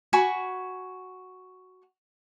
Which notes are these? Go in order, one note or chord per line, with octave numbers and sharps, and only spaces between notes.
F#4 G#5 B5 C#6